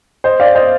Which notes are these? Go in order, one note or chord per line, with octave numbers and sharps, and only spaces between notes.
C5 D#5
D5 F5
C5 D#5